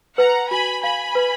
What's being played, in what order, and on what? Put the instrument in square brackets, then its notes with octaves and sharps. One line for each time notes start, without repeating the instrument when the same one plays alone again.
[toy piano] B4 [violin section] F#5 A#5
[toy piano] F#4 [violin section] G#5 B5
[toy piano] F5 [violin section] G#5 B5
[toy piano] B4